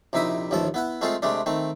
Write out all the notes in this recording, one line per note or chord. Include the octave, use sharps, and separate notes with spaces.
A#1 C3 D#4 E4 E5 D#6
A1 D#2 A2 F3 A4 A5
B3 E4 F#5
G#3 A3 C4 F4 G#4 A4
C3 G#3 A3 D4
D#3 A3 C4